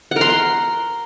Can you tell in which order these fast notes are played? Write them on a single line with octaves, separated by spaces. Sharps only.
F#5 A#4 C6